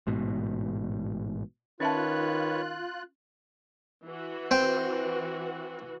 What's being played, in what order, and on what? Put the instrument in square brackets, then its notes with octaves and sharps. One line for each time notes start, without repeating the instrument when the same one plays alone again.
[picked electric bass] A1 G#2 B2
[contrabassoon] D#3 [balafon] C#4 E5 A5 [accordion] F4 F#6 [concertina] B4 C#5
[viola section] E3 F#4
[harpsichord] C4 G5